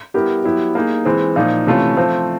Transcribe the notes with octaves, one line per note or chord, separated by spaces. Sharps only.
G3 B3 E4 G4 A#4
F#3 B3 E4 G4
A#3 D#4 G#4
E3 G#3 C4
A#2 F3 A#3 D#4
C3 E3 A3 C#4 F4
F3 A3 C4